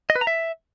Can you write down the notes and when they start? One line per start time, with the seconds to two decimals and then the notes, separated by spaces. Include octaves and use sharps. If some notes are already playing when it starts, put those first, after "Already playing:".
0.10 D#5
0.16 B4
0.21 A#5
0.27 E5